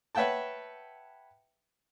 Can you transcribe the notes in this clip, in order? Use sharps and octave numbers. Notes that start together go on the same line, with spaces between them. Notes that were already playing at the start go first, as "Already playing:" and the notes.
B4 C#5 E5 F#5 G5 A5